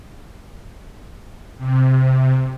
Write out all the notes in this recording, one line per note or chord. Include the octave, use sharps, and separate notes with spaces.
C3